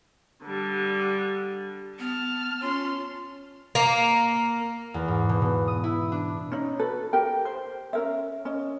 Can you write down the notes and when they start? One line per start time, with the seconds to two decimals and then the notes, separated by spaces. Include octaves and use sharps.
0.44 D3 G3
1.99 B3 A5 F6
2.62 C#4 F4 C6
3.75 A#3
4.94 E2
5.08 G#2
5.29 B2
5.42 B2
5.68 D#6
5.84 E4
6.12 D4
6.52 C#4 D#4
6.79 F#4 A4 B4
7.13 G4 A#4 G5
7.45 C5
7.93 C#4 A#4 E5
8.45 C#4 D#5